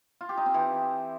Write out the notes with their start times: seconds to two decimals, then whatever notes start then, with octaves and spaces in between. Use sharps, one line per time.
0.21 F4
0.29 G4
0.37 D#4
0.46 C4
0.54 E3